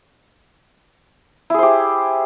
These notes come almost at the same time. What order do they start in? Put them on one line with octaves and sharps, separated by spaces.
E4 G#4 C5 G4